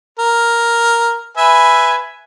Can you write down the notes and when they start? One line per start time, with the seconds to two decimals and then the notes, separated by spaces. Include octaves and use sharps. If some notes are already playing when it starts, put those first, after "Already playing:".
0.19 A#4
1.37 B4 E5 G#5